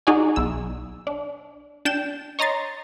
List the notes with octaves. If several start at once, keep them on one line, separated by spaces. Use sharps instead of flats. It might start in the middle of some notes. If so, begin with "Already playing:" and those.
D#4 F#4 G#4 D5 G#5
B1 E6
D4
D4 G5 G6 E7
C#5 D#5 A#5 C6 A6